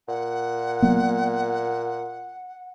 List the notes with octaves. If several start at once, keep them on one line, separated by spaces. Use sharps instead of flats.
A#2 F#5
F#3 A#3 B3